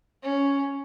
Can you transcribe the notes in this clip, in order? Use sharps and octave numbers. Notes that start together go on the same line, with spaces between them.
C#4